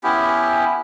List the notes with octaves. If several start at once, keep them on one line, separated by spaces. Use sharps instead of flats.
B3 C#4 E4 G4